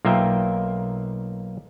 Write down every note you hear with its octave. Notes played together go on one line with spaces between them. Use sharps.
B1 A#3 F4 A#4 E5 G5